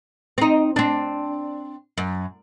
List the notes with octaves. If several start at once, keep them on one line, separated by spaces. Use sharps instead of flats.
C4 D#4
C4 D4
F#2